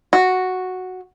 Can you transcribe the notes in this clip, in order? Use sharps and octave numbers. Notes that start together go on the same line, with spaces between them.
F#4